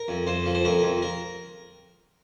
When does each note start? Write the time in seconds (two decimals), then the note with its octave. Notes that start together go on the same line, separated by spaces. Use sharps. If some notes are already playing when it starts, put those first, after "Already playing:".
Already playing: A#4
0.08 F2
0.27 F2 C5
0.46 F3
0.55 C5
0.65 F2 A#4
0.83 F2
1.02 A#4